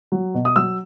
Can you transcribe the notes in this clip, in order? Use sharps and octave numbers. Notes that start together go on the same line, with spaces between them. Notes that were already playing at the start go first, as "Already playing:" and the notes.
F#3
B2
D#6
F#3 E6